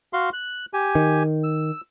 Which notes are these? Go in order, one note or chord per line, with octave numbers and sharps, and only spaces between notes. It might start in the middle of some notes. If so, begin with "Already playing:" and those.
F#4 F5 C6
F#6
G4 G#5
D#3
E6